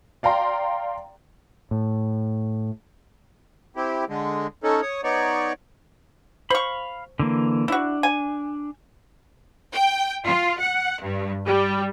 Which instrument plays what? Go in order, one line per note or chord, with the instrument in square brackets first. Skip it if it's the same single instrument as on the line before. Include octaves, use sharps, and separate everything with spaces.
[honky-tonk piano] D5 F5 G5 A#5 C6
[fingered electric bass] A2
[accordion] C4 E4 G4
D3 G#3
A3 C#4 D#4 A4
C#5 D#6
B3 D#4 C#5 D5
[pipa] C5 C#6 [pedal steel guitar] F5 B5
[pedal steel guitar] D3 E3 A#3
[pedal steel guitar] D4 [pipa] E4 F#4
[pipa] G#5
[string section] G5
F4
F#5
G2
G3